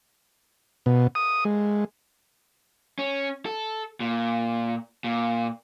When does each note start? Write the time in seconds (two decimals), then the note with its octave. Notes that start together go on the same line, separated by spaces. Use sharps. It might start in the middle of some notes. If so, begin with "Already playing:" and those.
0.86 B2
1.15 D#6
1.45 G#3
2.99 C#4
3.45 A4
4.00 A#2
5.04 A#2